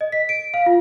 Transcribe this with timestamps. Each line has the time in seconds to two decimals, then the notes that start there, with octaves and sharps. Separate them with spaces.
0.01 D#5
0.12 B6
0.29 D7
0.54 F5
0.66 F4